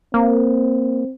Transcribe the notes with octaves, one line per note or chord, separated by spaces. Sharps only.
A#3 C4